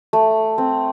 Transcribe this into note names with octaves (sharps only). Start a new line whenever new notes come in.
A3
C4